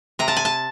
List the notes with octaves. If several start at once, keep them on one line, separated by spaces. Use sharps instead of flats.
C3 A#5
A5
G#5
A5